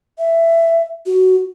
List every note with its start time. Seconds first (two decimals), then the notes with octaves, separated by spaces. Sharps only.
0.18 E5
1.06 F#4